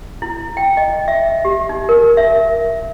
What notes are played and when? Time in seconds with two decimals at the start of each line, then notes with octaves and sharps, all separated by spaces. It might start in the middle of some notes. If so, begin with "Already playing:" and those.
0.22 E4
0.57 G5
0.77 D#5
1.08 E5
1.45 G4
1.69 D#4
1.89 A#4
2.17 E5